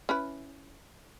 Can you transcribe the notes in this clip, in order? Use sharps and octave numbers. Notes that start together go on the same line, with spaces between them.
C#4 E4 B4